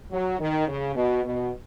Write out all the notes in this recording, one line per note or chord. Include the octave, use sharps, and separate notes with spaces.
F#3
D#3
C#3
B2
B2